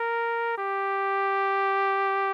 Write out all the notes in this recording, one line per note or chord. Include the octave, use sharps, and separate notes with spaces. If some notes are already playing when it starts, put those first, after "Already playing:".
Already playing: A#4
G4